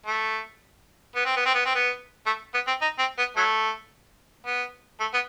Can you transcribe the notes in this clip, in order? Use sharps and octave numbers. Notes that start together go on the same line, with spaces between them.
A3
B3
C4
B3
C4
B3
C4
B3
A3
B3
C4
D#4
C4
B3
F#3 A3
B3
A3
B3